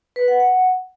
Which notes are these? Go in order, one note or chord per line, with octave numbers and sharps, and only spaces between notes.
B4
F#5
F#5